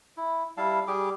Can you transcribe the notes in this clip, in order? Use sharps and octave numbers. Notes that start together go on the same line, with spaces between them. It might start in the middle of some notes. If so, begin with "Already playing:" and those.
E4
G3 E4 F5 A5
G3 G4 G#4 D6